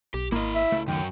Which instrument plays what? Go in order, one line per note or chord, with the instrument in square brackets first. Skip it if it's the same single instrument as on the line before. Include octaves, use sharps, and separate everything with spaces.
[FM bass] B1 [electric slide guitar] G4
[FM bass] G#1 [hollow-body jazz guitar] A#3 D#5 [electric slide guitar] E4 F5
[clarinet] E5
[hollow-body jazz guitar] C#2 A3
[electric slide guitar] F#2 F#4 [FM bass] D#3 [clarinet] G5